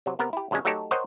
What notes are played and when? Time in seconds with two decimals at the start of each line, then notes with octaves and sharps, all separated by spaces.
0.06 C3 F#3
0.19 C3 B3 A#4
0.33 E4 G4
0.51 D2 G2 F#3 G#3 C#4
0.65 F#3 A3 D#4 G4 A4 C#5
0.91 A#4 C5 C#5 D#5 F#5 G5